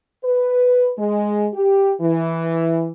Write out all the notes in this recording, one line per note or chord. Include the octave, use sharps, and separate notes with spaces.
B4
G#3
G4
E3